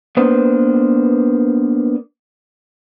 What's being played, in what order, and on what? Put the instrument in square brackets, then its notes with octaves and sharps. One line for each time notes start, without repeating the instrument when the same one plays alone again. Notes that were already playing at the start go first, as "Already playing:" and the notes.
[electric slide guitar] A#3 B3 D4 B4 C5